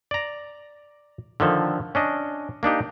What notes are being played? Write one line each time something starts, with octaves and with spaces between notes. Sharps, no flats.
D5 A#5
D3 D#3 F3 A4
C#4 D4 D#5
A#3 D4 D#4 G4